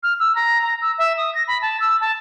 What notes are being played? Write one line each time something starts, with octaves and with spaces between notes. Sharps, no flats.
F6
E6
A#5
A#5
E6
E5
D#6
A#6
B5
A5
E6
A5